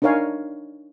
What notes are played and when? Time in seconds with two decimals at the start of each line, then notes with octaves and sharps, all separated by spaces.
0.02 D4 D#4 A#4 C#5 F5 G#5